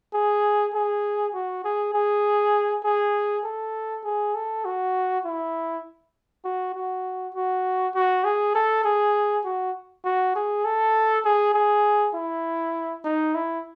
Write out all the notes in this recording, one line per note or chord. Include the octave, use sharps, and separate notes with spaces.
G#4
G#4
F#4
G#4
G#4
G#4
A4
G#4
A4
F#4
E4
F#4
F#4
F#4
F#4
G#4
A4
G#4
F#4
F#4
G#4
A4
G#4
G#4
E4
D#4
E4